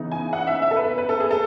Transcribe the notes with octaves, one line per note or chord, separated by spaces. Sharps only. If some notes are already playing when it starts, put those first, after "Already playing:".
Already playing: C#3 E3 B3 D#4
G#5
F#5
E5
E5
A4
B4
B4
A4
G#4
A4